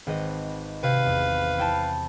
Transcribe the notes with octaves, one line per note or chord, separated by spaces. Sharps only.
G#1 B4 D#5
C3 B4 F5
E2
E4 G5 A5